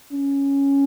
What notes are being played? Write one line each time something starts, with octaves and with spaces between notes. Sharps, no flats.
C#4